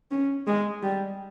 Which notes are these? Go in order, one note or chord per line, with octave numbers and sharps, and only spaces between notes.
C#4
G#3
G3